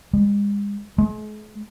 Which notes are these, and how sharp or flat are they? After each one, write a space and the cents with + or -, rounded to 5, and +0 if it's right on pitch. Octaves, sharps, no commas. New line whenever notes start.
G#3 -40
G#3 +40